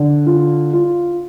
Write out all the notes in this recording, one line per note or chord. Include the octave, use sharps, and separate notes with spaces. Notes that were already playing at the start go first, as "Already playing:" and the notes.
Already playing: D3
F4
F4